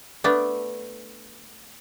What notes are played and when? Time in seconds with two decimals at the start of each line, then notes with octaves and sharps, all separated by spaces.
0.24 A3 B3 D4